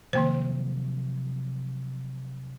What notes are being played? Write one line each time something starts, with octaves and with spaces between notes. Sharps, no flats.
C3 D#3 F3 F#3 A#3 C5